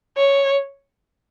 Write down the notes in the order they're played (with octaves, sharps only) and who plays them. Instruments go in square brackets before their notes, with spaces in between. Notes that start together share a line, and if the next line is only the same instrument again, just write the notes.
[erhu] C#5